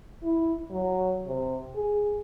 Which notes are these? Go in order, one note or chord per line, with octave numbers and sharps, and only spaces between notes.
E4
F#3
C3
G#4